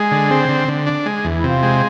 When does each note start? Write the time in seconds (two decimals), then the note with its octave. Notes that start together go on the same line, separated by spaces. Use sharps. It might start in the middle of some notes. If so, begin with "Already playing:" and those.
Already playing: G#3 G#4
0.11 D3
0.31 C4
0.49 D3
0.68 D3
0.86 D4
1.06 G#3
1.25 E2
1.37 E4
1.44 C3 F4
1.63 G#3